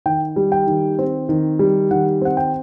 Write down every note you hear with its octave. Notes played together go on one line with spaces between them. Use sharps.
D#3 G5
G3
G5
D#3
C4
D#3
G3
D#3 F#5
C4 F#5
G5